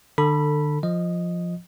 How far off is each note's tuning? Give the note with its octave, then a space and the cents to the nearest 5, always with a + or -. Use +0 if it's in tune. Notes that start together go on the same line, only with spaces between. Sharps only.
D3 +30 A4 +20 B5 -10
F3 +0 D#5 -5